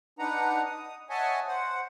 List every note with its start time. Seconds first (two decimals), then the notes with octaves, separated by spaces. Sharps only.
0.19 D4 D#4 B4 F#5 A#5
0.66 D#6
1.10 C#5 D#5 E5 F#5 G#5 A5
1.47 C5 F#5